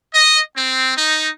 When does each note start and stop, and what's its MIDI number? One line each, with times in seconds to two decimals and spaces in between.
0.14 0.40 75
0.56 0.96 60
0.97 1.29 63